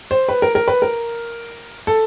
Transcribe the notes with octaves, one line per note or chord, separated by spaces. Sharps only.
C5
B4
A#4
A#4
B4
A#4
A4